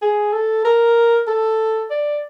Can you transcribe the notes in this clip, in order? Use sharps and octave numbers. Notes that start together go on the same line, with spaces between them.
G#4
A4
A#4
A4
D5